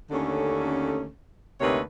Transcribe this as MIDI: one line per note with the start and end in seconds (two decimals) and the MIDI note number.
0.11 1.07 39
0.11 1.07 50
0.11 1.07 57
0.11 1.07 61
1.61 1.80 38
1.61 1.80 48
1.61 1.80 58
1.61 1.80 63
1.61 1.80 71
1.61 1.80 73